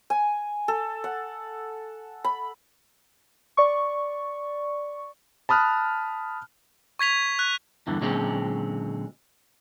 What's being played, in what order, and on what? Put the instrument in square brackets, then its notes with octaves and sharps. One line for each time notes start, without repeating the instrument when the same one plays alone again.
[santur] G#5
A4
F#5
B5
[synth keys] D5 C#6
[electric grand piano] A5 B5 D#6 F6 F#6
[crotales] C#6 G#6 B6 F7
F#6
[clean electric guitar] E2 G2 D3 E3
A#2 D3 F#3 G#3 C4 C#4